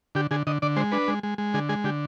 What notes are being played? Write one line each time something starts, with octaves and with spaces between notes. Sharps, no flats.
D3 G4
D3 G#4
D3 D#5
D3 D5
G#3 C5
D4 B4
G#3
G#3
G#3
D3 G#4
G#3 G#4
D3 G4